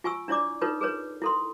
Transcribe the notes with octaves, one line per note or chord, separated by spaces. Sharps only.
F4 G#5 C#6 E6
D4 E4 C#5 D5 D6
D#4 F4 A4 B4 C#5
G#4 A#4 B4 C#5
E4 A4 C6